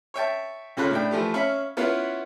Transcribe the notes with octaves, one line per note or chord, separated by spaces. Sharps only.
C#5 E5 G5 A5
C#2 C#4 F4 A4 B5 F#6
A2 D4 G5
E3 F3 A3 G4
C#4 E5 F5 B5 C#6
B3 C#4 E4 F4 B4 F5